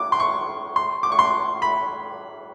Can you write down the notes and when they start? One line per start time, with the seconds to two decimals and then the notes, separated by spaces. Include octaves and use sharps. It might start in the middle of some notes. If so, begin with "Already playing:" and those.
Already playing: D6
0.12 C6
0.20 C#6
0.76 C6
1.03 D6
1.12 C#6
1.19 C6
1.62 B5